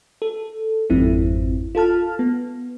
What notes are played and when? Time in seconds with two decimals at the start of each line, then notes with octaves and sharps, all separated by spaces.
0.22 A4
0.90 G#1 F2 G#2 F3 C4 E4
1.75 F4 A4 A5 F6
2.19 B3